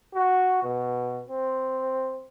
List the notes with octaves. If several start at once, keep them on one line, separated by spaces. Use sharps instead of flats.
F#4
B2
C4